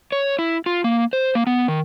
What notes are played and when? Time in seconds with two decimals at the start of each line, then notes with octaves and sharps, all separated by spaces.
0.12 C#5
0.39 E4
0.66 F4
0.84 A#3
1.13 C5
1.35 A#3
1.47 B3
1.68 D#3